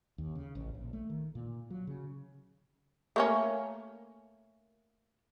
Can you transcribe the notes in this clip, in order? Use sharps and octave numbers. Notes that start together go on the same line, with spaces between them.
D#2
C#3
A1
A#1
A3
D#3
A#2
F#3
C#3
A3 A#3 C#4